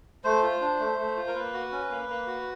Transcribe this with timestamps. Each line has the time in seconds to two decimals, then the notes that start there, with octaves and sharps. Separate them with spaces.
0.24 A3 C5
0.42 F4
0.61 D4
0.79 A3
0.98 A3
1.16 F4
1.27 A#4
1.34 A#3 B4
1.53 F#4
1.72 C#4
1.90 A#3
2.09 A#3
2.27 F#4